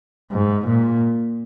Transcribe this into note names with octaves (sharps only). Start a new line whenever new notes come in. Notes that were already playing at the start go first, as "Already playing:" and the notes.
G#2
A#2